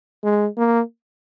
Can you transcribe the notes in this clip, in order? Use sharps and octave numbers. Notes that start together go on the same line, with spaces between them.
G#3
A#3